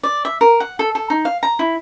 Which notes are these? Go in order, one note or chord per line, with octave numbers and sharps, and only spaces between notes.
D5
E5
A#4
F#5
A4
A4
D#4
F5
A#5
E4